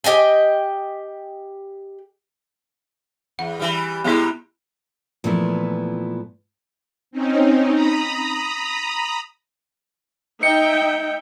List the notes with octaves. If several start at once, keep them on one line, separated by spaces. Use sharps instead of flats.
G4 D#5 G5 G#5
E2 F#5
E3 G3
C3 G3 G#3 B3 E4
A#2 E3 F3 A3 B3 E4
C4 C#4 D#4
A#5 B5 D#6
D#4 D#5 E5 G5 C#7